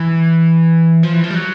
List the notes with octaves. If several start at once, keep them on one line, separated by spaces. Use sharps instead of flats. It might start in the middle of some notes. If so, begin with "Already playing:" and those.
Already playing: E3
F3
E3
F3
G3
F#3